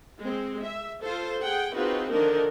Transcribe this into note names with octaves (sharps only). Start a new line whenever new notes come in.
G#3 C4
E5
F4 A4 C5
G#4 F#5 G5
C4 D#4 F4 F#4 G#4 B4
D3 D#3 F3 D4 D#4 A#4